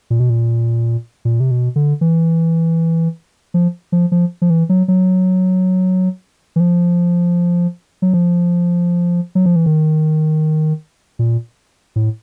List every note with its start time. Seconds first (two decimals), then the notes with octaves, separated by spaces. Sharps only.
0.10 A#2
0.20 B2
0.30 A#2
1.25 A#2
1.40 C3
1.51 B2
1.76 D3
2.01 E3
3.54 F3
3.92 F3
4.12 F3
4.42 F3
4.50 E3
4.69 F#3
4.88 F#3
6.56 E3
6.60 F3
8.02 F#3
8.13 F3
9.35 F#3
9.45 F3
9.56 E3
9.66 D#3
11.19 A#2
11.96 A2